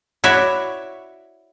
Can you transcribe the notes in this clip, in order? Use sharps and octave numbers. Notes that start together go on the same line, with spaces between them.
E4 F#4 C#5 D5 E5